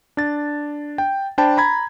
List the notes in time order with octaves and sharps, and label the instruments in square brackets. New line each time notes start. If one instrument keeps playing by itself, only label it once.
[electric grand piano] D4 A6
G5
D4 C5 G5 A5 B5
A#5 B5 G#6